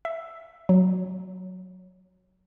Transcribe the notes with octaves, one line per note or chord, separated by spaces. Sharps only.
E5
F#3